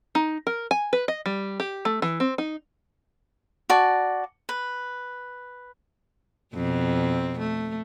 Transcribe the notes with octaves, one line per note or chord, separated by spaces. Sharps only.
D#4
A#4
G#5
B4
D#5
G3
G4
A3
E3
C4
D#4
F#4 D5 A5
B4
F2 B2 C4
A3